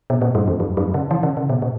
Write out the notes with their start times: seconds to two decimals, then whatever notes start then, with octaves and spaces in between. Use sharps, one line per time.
0.10 B2
0.22 A#2
0.35 G2
0.48 E2
0.60 F#2
0.77 F#2
0.94 C#3
1.11 E3
1.23 C#3
1.37 C#3
1.50 B2
1.62 A#2